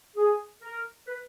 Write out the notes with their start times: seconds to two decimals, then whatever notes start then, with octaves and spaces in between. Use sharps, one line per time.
0.16 G#4
0.61 A#4
1.07 B4